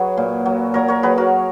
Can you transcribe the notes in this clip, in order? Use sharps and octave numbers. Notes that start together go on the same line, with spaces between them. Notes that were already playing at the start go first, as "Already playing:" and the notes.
Already playing: F#3 G#4 B4 C#5
A#2
F#3
A#2 A#4 C#5
A#4 C#5
F#3 G#4 B4
F#4 A#4